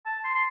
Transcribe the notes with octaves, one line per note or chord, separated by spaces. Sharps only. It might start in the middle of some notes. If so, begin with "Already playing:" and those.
A5
C6
C6